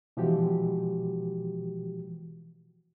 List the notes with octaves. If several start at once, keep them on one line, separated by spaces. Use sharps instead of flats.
B2 E3 F3 G#3 F#4 G4